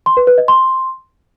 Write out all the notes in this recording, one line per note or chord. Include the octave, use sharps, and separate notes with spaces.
C6
B4
B4
D#5
C6